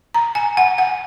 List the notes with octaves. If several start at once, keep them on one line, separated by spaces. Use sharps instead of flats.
A#5
G#5
F#5
F#5